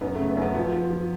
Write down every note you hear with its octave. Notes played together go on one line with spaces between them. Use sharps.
F#2 B3
A3
C#3
B3
F#2
B3
F3 B3
F3
F3